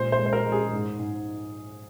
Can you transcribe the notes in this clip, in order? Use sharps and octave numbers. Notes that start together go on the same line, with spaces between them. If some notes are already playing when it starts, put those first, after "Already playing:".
Already playing: A#2 G#3 C5
C5
G#3
C5
A#4
G#3
G#4
G#2
G#2